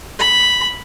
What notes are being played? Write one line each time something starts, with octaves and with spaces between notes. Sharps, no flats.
B5